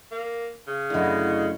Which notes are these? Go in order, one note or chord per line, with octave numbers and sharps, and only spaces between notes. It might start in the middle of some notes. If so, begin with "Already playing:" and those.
A#3
C#3
F#2 D3 A3 E4 F#4 D#5